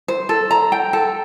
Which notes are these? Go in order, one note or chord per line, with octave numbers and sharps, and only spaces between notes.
C5
A4
A#5
G5
A4